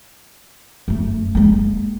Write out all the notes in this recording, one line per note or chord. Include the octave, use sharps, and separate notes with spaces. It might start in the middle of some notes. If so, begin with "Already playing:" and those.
F#2 A3
G#3 A#3